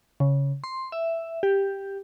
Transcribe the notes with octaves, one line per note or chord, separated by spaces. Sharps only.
C#3
C6
E5
G4